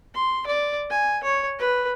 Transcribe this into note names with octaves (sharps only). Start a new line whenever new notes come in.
C6
D5
G#5
C#5
B4